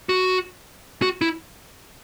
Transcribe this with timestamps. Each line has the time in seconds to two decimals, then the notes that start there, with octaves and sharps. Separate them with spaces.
0.09 F#4
1.02 F#4
1.21 E4